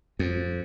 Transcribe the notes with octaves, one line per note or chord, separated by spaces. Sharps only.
F2